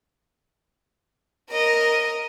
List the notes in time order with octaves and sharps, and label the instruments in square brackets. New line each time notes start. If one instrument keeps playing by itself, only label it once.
[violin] A#4 D#5